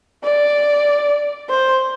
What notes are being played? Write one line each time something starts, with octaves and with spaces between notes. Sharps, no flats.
D5
C5